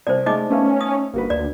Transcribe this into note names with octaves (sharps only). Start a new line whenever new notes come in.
C2 C5 D5
G#3 A3 D#4 D#5 D6
A3 B3 C#4 F5
D#6
G1 A#3 F#4 B4
D2 D5